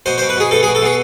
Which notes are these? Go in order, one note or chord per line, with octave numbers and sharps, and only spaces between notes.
B2 C5
C5
B2
B4
B2 G#4
B2 A4
G#4
B2
A4
B2 G#4